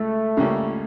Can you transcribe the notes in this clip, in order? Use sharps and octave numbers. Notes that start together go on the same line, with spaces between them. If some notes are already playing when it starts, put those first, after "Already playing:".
Already playing: C#2 A3
C#2 C#3 G3 A#3 C#4